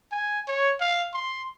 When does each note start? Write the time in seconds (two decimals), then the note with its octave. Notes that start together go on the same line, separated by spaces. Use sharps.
0.12 G#5
0.48 C#5
0.81 F5
1.14 C6